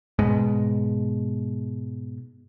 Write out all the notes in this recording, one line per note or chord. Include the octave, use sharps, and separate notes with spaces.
G#2 B2 G#3